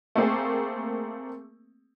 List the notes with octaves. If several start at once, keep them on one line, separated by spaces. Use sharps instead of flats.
A3 A#3 C4 G#4